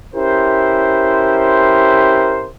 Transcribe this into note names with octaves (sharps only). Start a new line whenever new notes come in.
C#4 E4 G4 A#4 C5